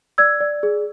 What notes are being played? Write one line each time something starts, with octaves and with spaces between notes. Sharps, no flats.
D5 E6 G#6
D5
G#4